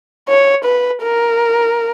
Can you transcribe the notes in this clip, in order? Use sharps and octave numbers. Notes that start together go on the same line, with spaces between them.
C#5
B4
A#4